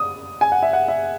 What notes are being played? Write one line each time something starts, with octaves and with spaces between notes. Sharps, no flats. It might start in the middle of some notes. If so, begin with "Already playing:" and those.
Already playing: D#6
G#5
F#5
E5
F#5
E5